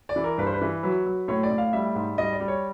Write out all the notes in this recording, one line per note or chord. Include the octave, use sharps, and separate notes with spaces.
D5
E3
A#4
G2 B4
C5
B4
E3
F#3 B4
F#3
A2 C#5
D5
A2
F5
G3 E5
G#2
G3 D#5
D5
G3
C#5